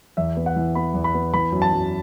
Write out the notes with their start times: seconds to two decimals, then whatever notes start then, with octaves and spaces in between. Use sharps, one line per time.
0.17 E2 E5
0.37 B3
0.46 F#5
0.56 E3
0.75 B3 B5
0.94 E2
1.04 B5
1.14 B3
1.33 E3 B5
1.52 F#2
1.62 A5
1.73 F#2